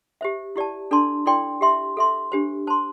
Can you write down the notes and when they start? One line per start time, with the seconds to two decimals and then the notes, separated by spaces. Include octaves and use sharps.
0.21 G4 C5 E5
0.56 E4 G4 D5 A5
0.91 D4 A4 D5 A5 C6
1.26 E4 A4 D5 G5 C6
1.61 G4 E5 C6
1.97 A4 E5 C6
2.32 D4 G4 C5
2.67 C5 A5 C6